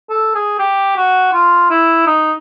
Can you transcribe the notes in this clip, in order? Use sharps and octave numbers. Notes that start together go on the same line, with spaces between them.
A4
G#4
G4
F#4
F4
E4
D#4